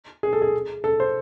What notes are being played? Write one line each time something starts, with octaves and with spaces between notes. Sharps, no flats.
G#4
A4
G#4
A4
C5